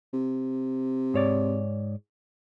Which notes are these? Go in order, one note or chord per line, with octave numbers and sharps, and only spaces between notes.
C3
G#2 C#5 D5